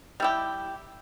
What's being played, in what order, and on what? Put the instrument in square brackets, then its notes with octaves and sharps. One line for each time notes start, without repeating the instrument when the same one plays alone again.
[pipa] G3 E4 G4